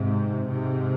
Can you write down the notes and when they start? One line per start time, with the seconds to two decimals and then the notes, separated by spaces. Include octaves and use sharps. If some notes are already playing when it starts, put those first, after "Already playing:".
Already playing: G#2 C3
0.47 G#2 C3